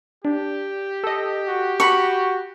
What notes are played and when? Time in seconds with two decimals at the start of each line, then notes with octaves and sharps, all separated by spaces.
0.25 D4 G4
1.04 A4 D#5
1.47 F#4
1.80 F#4 B5 C#6